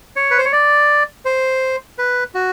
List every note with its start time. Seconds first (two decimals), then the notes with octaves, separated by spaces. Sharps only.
0.16 C#5
0.31 B4
0.38 C5
0.45 C#5
0.52 D5
1.25 C5
1.98 B4
2.35 F#4